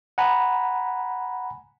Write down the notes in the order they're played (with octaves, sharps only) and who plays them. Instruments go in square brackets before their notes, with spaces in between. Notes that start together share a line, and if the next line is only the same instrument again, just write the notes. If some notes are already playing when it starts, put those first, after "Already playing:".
[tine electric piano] F#5 G#5 A#5 B5